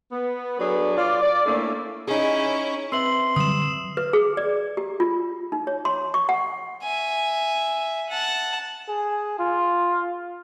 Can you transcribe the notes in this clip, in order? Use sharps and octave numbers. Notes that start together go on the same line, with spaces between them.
B3
F#3 D4 G#4 A4 B4
F4 D5
D5
A3 A#3 C#4 D4 E4
C#4 D#4 E4 G#4
C4 B4 E5 C6 E6 F#7
D3 F#3 G3 D#6 E7
B4
G#4
D5
G4
F4
D#4
C#5
C6
C#6
F#5
E5 G#5
F#5 A5
G#4
F4